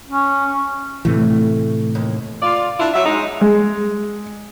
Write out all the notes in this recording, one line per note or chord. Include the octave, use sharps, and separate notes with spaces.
C#4
A2 C3 E3 A3
D#2
F4 D5
D4 E4 F4 D5
F#3 E5
G#3 D#4
G#3